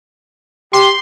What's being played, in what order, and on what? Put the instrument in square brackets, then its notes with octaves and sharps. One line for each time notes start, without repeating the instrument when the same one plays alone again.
[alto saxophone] G4 [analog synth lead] C6